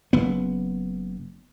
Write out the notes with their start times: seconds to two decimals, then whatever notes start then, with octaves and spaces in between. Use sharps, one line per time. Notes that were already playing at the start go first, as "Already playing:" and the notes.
0.13 F#1 B3